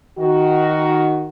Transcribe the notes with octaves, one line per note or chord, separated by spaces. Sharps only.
D#3 F#4